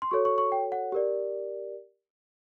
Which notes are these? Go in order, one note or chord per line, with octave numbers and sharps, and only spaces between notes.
C6
F#4 A4 C#5 C#6
C#6
C#6
G5
F#5
G4 A#4 D5